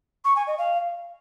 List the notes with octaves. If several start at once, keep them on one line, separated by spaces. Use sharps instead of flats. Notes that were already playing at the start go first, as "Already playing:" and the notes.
C#6
G#5
D#5
F5